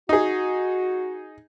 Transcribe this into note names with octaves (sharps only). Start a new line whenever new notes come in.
D#4 F#4 G#4